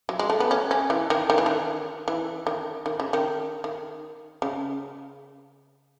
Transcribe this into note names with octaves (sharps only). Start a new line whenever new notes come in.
F#3
G#3
A3
B3
C#4
C#4
E3
D#3
D#3
E3
D#3
E3
D#3
D#3
C#3
D#3
D#3
C#3